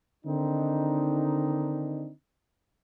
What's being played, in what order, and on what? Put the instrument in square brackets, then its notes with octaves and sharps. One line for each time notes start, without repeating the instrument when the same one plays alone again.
[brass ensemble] D3 D#3 C4 D4 D#4